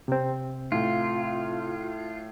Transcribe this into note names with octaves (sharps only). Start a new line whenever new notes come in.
C3 C4
A2 F4